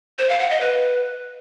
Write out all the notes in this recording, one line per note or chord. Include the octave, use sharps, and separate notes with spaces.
C5
F5
F#5
D#5
B4